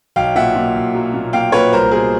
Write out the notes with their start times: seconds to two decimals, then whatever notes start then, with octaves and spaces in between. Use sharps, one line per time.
0.16 B1 F5 G5
0.35 A#2 E5 F#5
0.56 A#2
0.75 B1
0.94 F#3
1.14 A#2
1.33 A#3 F5 G5
1.52 A#2 B4 C#5
1.72 C2 A#4 C5
1.91 B2 G#4 A#4